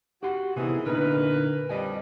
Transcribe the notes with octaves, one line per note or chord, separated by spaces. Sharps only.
F#4 G4 F#5 C6
C3 D#3 E3 B3 E4 G#4
A#2 D3 E3 D#4 A#4 B4
F2 G3 C#5 D#5 G#5